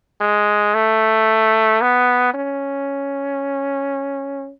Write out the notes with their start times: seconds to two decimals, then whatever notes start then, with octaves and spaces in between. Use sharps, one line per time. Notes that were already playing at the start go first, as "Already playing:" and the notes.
0.21 G#3
0.75 A3
1.82 B3
2.34 C#4